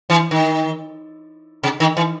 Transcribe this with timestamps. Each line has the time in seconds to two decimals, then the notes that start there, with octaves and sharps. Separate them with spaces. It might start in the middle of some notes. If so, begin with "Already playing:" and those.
0.10 E3
0.31 D#3
1.63 C3
1.80 D#3
1.97 E3